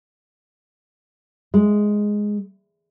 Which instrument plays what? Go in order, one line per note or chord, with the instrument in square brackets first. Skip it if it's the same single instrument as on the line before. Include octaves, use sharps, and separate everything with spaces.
[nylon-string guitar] G#3